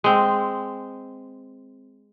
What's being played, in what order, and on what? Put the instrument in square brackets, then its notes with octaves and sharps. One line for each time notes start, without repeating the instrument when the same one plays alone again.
[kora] G#3 C4